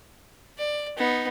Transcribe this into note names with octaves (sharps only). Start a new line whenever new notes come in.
D5
B3 D#4